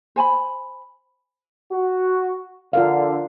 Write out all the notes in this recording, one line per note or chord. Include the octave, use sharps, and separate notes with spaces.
C5 G#5 A5 B5
F#4
D3 F4 A#4 F5